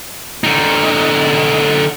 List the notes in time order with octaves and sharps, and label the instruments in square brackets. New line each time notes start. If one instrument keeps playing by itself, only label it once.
[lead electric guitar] D3 D#4